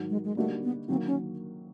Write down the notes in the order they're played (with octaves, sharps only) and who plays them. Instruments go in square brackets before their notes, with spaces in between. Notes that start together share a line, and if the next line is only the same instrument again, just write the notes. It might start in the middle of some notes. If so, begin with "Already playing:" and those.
Already playing: [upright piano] G#2 D#3 F#3
[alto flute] G#3
G#3
[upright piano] D3 G3 A#3 D#4 F#4 [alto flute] A3
[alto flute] B3
[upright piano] D#3 F#3 A#3 [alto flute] C4
[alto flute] C#4